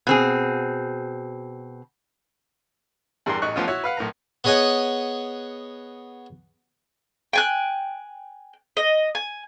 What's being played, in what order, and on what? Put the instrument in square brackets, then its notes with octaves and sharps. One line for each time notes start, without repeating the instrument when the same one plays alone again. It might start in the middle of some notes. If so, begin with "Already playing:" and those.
[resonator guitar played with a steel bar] B2 C4 G#4
[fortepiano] E2 G2 A#4 G5 C6
A1 D#4 C#6 F#6
A2 E3 F3 B3 C#4 F4
E4 F#4 C#5
B4 F5 F#5
B1 A2 A#4 A#5
[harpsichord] B3 G#4 C#5 D#5 F#5 G#5
[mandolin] G5 G#5 F#6
D#5
G#5